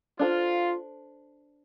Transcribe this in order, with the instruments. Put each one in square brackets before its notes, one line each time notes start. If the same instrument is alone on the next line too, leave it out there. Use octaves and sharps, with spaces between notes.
[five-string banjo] D4 A4 C5 [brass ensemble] F4